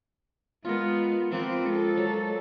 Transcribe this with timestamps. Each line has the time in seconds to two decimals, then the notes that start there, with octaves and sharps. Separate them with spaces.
0.65 G#3 B3 F4 A#4
1.32 F3 A#3 C4 B4
1.65 G#3 A4
1.97 F#3